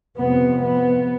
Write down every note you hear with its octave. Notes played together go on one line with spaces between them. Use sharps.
F2 C3 B3
B3